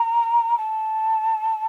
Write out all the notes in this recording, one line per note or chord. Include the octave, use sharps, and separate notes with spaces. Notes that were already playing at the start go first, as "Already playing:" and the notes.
Already playing: A#5
A5